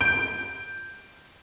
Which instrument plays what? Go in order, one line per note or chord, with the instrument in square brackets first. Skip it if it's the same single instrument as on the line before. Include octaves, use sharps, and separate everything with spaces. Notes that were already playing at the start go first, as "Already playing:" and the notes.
[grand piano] G6 [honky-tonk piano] D7